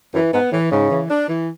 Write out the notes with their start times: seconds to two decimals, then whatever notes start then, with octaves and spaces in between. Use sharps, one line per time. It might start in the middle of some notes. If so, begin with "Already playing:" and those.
0.13 F#2 E3
0.33 G#2 B3
0.52 A2 E3
0.71 G#2 C#3
0.90 E3
1.09 D4
1.28 E3